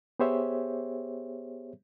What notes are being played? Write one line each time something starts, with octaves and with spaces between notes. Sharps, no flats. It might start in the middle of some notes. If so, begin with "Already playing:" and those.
B3 G4 G#4 C5 C#5 E5